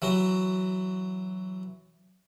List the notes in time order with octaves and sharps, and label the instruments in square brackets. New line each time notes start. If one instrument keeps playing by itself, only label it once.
[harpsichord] E3 F#3 F#4